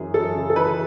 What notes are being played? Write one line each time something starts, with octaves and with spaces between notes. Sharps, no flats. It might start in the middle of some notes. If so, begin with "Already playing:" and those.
Already playing: F#2 E3 G#4
F#2 A4
C#3
A4
E3 B4